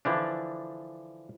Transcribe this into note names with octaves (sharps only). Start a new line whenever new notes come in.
D3 E3 F3 D4